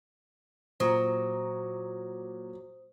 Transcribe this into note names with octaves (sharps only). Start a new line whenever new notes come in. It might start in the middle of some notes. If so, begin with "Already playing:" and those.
A#2 F#3 C5 A#5 D#6